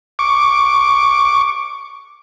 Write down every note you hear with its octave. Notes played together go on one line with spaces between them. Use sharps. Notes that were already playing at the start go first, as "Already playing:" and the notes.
C#6 D6